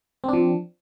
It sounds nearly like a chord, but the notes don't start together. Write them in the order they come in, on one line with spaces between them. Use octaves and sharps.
C4 D4 F3